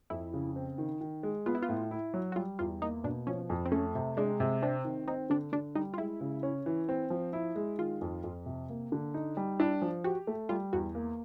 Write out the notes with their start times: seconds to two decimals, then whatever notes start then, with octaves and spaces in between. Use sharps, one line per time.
0.10 F2 E4
0.34 C#3
0.56 C4
0.78 D#3
1.01 D#3
1.23 G#3
1.46 B3 F4
1.55 E4
1.62 F4
1.69 A2
1.91 E4
2.14 F#3
2.32 F#4
2.36 G3 F4
2.59 E2 F4
2.82 A#3 D#4
3.04 B2 D4
3.27 F3 C#4
3.50 F2
3.66 C4
3.72 A3 C#4
3.95 C3
4.17 G#3 D4
4.40 C3
4.62 C4 D4
4.85 D#3
5.07 C4 D#4
5.30 D3 D4
5.52 D3 D4
5.75 G3 D#4
5.94 F4
5.98 G#3 E4
6.21 C#3
6.43 C#4
6.66 E3
6.89 C4
7.10 F3
7.33 E4
7.56 G#3
7.78 D#3 F4
8.01 F2
8.24 F2
8.46 C3
8.70 A#3
8.92 D3
9.14 D#4
9.37 G3
9.60 D4 E4
9.82 F3
10.04 F#4 G4
10.27 A3
10.49 G3 F4
10.73 E2 F#4
10.95 A#3